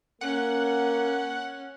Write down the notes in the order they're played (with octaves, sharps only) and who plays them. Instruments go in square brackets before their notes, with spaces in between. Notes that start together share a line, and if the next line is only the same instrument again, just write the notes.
[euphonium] A#3 [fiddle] C#4 [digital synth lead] F#5